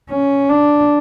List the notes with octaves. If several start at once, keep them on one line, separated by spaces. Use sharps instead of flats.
C#4
D4